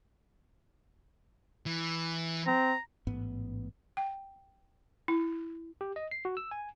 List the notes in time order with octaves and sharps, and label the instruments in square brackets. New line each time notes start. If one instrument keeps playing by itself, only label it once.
[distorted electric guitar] E3
[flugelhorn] C4 [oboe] A#5
[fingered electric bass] A1 G#2 B3
[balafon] G5
E4
[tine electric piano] G4
D#5
C7
F#4
E6
G#5